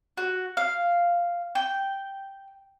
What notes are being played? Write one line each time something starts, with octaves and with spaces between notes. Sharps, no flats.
F#4
F5
G5